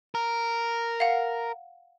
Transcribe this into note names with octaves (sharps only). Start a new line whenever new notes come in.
A#4
F5 F#5